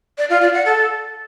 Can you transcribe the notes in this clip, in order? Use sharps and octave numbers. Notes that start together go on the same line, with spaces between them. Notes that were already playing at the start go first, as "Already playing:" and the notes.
D5
F4
D5
F#5
A4